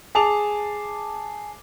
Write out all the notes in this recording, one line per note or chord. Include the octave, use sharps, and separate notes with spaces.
G#4 A5 D6 F7